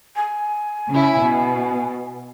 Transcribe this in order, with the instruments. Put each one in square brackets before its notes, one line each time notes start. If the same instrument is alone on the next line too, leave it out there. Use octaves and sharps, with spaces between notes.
[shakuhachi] G#5
[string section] C#3 E4
B2